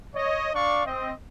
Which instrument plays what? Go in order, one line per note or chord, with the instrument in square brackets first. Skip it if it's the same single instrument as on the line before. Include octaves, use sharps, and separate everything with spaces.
[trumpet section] C#5 D#5
D4 D5 F5 C#6
C4 D#5